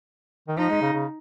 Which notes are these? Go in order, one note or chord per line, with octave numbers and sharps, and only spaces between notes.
D#3
F3 D#4
G#3
C#3
C#3